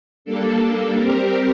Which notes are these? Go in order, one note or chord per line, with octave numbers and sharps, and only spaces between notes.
G3 A#3 D4 A4
G3 C4 G4 A#4